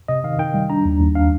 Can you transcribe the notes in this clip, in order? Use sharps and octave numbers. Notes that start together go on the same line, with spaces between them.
C3 D#5
D#3 F5
D#3 G5
G3
D4 A#5
D#2
D#2
D4 F5